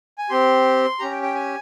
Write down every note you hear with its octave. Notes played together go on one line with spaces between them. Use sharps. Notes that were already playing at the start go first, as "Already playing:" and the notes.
G#5
C4 G4 C6
C#4 G4 A#5
G5
G5
G#5